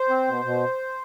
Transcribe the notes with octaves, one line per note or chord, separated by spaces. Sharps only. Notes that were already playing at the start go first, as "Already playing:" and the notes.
Already playing: C5
C4
B2
B2